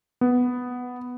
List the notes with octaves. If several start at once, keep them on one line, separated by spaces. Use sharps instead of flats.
B3